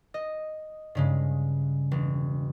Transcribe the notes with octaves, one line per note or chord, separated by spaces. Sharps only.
D#5
G2 C#3 G#3
E1